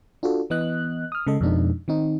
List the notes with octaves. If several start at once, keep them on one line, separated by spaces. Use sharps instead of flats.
D4 F4 F#4 A4
E3 B3 D#5 F#6
D#6 F6
C#3 G#3 A4 D#5
F2 B2 G#3 D4 D#4
D#3 C4 D#4